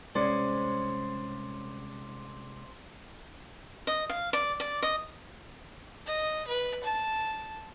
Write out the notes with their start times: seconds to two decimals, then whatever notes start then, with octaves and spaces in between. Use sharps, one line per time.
0.15 C2 G#3 C#4 C5 D5
3.87 D#5
4.10 F5
4.33 D5
4.60 D5
4.83 D#5
6.07 D#5
6.48 B4
6.84 A5